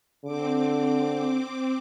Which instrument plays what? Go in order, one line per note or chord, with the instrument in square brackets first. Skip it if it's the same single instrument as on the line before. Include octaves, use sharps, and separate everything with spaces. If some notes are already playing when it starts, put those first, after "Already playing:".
[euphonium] D3 [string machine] C4 D6